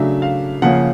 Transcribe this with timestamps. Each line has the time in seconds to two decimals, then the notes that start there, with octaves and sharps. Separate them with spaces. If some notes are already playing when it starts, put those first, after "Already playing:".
Already playing: C#3 F#3 A3 D4 E5
0.22 F5
0.62 C#3 F3 A#3 C#4 F#5